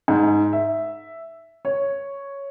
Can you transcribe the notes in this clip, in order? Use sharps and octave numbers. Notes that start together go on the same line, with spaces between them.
G#2
E5
C#5